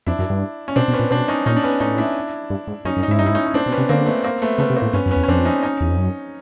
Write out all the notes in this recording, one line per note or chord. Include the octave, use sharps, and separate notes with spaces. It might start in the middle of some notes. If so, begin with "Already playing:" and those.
F2 D4 E4
F#2
G2
C#4
B2 C4 D4
B2
B3 C#4
A#2
B2 C4 D4
C#4 D#4
A#2 C#4 D#4
D4
B3 C#4
A2 C#4 D#4
D4 E4
G2
G#2
F#2 C#4 D#4
F#2
D#4
G#2 E4
G2 D#4
E4
G#2
C#4 D#4
C#4
A2 C4 D4
B2
B3 C#4
C3
D3 A#3 C4
A3 B3
A#3 C4
A3 B3
C#3 A3 B3
C3
A#3 C4
A2
G2 B3 C#4
F#2
B3 C#4
E2
C#4
F2 C4 D4
C#4 D#4
C#4 D#4
E2
F2
F#2